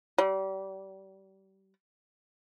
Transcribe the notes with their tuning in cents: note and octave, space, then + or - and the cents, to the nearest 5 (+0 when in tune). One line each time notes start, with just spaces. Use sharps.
G3 -30